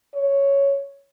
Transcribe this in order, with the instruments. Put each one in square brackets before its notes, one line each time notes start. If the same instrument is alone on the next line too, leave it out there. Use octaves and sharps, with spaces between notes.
[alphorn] C#5